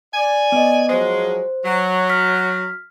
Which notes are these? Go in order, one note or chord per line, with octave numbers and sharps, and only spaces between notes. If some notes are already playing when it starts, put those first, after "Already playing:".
D5 G#5
B3 D#5
F3 F#3 G#3 C5
F#3
F6 B6